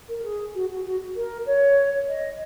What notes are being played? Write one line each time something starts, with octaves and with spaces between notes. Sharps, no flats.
A#4
G#4
F#4
F#4
F#4
A#4
C#5
D#5